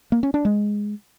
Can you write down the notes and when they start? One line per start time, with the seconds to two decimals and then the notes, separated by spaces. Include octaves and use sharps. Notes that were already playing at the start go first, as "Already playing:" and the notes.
0.12 A#3
0.23 C#4
0.34 D4
0.45 G#3